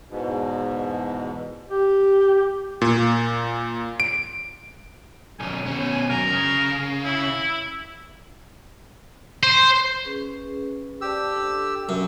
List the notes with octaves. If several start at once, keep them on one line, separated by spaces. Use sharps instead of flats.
E2 G#2 B2
G4
A#2
D7
B1 F#2 G#5
B2 C#4
F#2 A#4
C#3
E4
C5
C#4 G#4 B4
G4 C5 D5 A5 E6
D4 A4
F#2